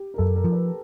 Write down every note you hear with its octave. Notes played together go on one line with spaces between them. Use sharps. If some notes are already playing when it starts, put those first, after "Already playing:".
Already playing: G4
A#4
F#2 A4
A#4
F3
B4